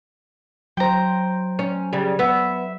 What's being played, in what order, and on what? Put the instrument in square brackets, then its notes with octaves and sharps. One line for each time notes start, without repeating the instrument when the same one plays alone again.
[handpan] F#3 C5 [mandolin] G5 A#5
[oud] C#4
C#3 G3
[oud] B3 [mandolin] E5